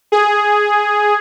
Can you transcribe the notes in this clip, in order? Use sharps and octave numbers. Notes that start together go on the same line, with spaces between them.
G#4